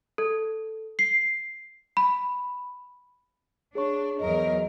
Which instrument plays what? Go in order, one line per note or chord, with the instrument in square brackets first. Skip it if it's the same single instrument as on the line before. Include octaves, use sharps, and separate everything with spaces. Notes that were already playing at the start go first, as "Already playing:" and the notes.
[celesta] A4
C7
B5
[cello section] D4 [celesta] G#4 C#5 C#6
[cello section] E2 F#3 A#4 [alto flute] D#5